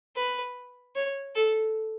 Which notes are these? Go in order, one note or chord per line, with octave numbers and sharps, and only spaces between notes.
B4
C#5
A4